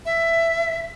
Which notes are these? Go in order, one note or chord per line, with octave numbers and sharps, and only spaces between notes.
E5